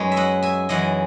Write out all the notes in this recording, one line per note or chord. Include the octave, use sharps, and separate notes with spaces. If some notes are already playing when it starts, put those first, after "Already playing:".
Already playing: F#2 G#3 B4 C#5
E5
D#5 F#5
E5 G#5
F#2 E3 G#3 D#5 F#5